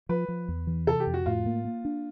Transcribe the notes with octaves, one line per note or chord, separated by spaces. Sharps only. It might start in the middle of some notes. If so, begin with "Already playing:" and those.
F3 B4
F3
E2
E3
C3 A4
G4
F2
F#4
A2 F4
A#3
A#3
D4